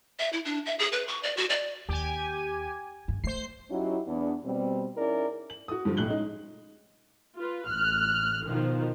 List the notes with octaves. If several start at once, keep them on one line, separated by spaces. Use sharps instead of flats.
E5
E4
D4
E5
G#4
B4
C#6
D5
F#4
D5
D#2 G4 G#5
G2
A3 C5 C7
F#3 C#4 D#4 E4 F#4 G4
E2 B3 D4
B2 G3 C4
C#4 D#4 E4 G#4 A#4 D5
F#7
F#4 D#6
G2 D3 F3
B1 A2 F#6 F#7 G7
G#3 C#4 D#4
F4 B4
A1 F6 F#6
B2 D#3 F3